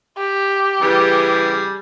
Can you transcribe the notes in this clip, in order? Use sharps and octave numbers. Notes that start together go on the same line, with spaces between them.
G4
C#3 E3 G3 G#4